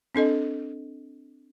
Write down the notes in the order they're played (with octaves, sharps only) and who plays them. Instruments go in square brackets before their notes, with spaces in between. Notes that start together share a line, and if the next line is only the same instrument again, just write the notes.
[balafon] C4 D4 A4 D#5